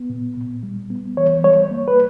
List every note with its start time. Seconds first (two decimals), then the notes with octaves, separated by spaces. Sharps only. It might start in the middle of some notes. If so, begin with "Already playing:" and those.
Already playing: B3
0.10 A#2
0.37 A#2
0.63 G3
0.90 B3
1.17 E3 C#5
1.44 G3 C#5
1.71 A#3
1.88 B4